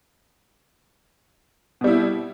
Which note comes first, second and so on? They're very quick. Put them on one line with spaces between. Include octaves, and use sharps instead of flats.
B2 G3 E4